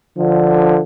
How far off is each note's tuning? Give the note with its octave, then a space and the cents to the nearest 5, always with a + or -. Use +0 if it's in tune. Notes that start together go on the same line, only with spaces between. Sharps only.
D3 +10 F3 +0